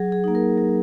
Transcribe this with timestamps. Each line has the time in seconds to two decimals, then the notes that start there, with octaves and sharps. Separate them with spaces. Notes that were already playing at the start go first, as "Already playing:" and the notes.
Already playing: F#3 G#4
0.12 G#4
0.24 A#3 D#4
0.35 A#4
0.57 F#3